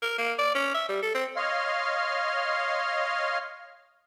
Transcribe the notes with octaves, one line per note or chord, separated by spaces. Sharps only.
A#4
A#3
D5
C#4
E5
G3
A4
C4
C#5 D#5 F5 C6 F6